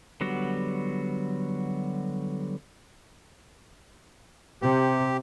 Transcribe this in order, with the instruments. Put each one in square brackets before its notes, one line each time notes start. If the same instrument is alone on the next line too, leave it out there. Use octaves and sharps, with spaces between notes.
[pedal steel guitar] D3 F#3 G3 B3 F#4
[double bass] C3 [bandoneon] G4